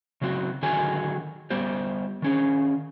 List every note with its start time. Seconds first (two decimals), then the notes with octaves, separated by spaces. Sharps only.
0.21 C#3 F#3 C4 F#4
0.63 D3 D#3 F#3 F#4 G#4 G#5
1.50 G3 B3 G4 C5
2.22 D#3 C#4 G#4